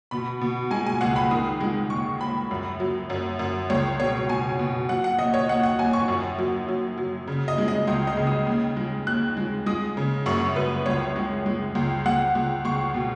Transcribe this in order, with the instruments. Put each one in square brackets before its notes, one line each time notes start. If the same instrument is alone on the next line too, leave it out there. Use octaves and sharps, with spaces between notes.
[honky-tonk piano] B2 B5
B2
G#3 G#5
G#5
C#2 F#5
B5
D#3 D#6
G#3
D#2 C#6
D#2 B5
F#2
F#3
F#2
F#2
C#2 C#5
B2 C#5
B2 G#5
B2
F#3 F#5
F#5
D#2 D#5
C#5
D#2 F#5
F#5
D#2 G#5
C#6
F#2
F#3
F#3
F#3
C#3
D#5
G#3
D#5
C#2 D#5
D#5
C#3
D#6
D#2
G#3
D#2 F#6
G#3
G#3 D#6
C#3
F#2 C#6
F#2 B4
C#2 C#5
G#3
G#3
C#2
C#2 F#5
C#2
C#2 C#6
B2